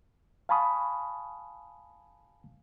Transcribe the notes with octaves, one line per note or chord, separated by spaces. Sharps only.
F5 G#5 A5 B5 C#6 D#6